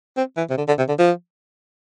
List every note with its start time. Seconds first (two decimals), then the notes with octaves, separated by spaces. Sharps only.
0.17 C4
0.37 E3
0.50 C3
0.58 D3
0.68 D3
0.78 C3
0.88 D3
0.98 F3